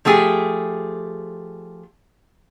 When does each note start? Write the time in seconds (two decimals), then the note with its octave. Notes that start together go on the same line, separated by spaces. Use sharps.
0.05 F3 A3 G4 G#4